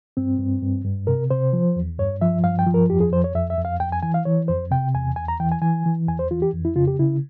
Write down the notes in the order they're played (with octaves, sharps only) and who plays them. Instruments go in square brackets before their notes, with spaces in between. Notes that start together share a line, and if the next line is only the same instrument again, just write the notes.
[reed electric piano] G2 C4
G2
G2
G2
C3 A#4
C3 C5
F3
E2
G2 C#5
F3 E5
G2 F5
G5
F3
A#4
F2 G4
G#4
F2 C5
C#5
F2 E5
E5
F2
F5
F2 G5
G#5
E3 G#5
F5
E3 C#5
F2 C5
C3 G5
E2 G#5
E2 G#5
A#5
E3 G5
G#5
E3 G#5
E3
E2 G#5
C5
E3 F4
G4
F2
E4
C#3 F4
G4
C#3 E4